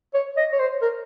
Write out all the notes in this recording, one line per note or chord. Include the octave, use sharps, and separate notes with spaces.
C#5
D#5
C#5
C5
A#4